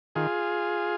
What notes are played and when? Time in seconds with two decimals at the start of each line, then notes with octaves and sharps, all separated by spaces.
0.15 D#3 F4 G#4